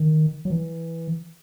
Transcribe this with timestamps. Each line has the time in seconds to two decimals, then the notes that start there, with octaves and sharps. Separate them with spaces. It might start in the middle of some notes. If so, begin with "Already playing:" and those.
Already playing: D#3
0.45 F#3
0.50 E3